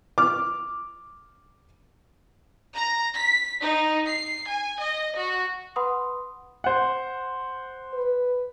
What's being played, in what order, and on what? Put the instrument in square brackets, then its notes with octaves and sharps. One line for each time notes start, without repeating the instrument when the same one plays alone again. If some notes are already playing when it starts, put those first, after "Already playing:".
[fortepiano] D6 F6
[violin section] A#5
B6
D#4
C7
G#5
D#5
F#4
[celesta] B4 F#5 B5 C6 D#6
[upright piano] C5 F#5
[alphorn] B4